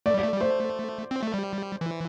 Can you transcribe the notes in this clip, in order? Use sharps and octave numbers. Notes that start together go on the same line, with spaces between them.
A3 D5
G3
D5
A3
G3
A3 C5
C4
A3
G3
E3